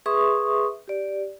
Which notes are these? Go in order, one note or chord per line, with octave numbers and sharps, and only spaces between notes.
G#4 B4 E5 C6 C#6 D#6
G4 D5